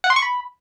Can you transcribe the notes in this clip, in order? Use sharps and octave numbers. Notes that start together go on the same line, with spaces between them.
F#5
C6
C#6
B5